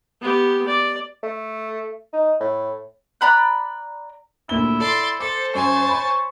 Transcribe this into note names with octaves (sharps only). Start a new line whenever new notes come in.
B3 G4
D5
A3
D#4
A2
D5 A#5 B5 F#6
D2 A#2 E4 G7
A4 D5 C6
A4 C5 D6
F#2 C#5 G#5 A5
B5 C#6